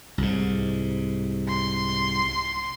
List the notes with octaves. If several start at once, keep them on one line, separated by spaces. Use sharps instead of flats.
C2 G#2
C6